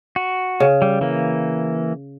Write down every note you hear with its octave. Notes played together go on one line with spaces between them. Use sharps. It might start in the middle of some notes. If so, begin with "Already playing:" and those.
F#4
C#3
G3
E3 A#3